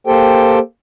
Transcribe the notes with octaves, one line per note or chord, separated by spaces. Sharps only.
A#3 G4 A4 C5 G5